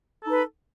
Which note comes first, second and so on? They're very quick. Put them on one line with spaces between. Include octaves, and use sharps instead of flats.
A4 D#4 B4